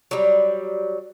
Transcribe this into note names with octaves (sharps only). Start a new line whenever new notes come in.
F#3 G3